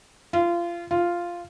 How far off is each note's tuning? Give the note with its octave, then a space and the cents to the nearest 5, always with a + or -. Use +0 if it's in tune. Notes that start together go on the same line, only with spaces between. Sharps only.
F4 -25
F4 -5